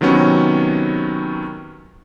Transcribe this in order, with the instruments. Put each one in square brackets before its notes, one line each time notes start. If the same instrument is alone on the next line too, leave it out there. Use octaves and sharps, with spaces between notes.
[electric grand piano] C3 D#3 F#3 B3 C#4